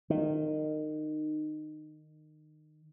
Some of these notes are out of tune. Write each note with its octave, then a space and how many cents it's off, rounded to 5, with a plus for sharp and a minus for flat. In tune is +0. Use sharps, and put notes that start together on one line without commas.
D#3 -20